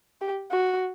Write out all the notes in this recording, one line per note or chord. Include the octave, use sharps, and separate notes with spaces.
G4
F#4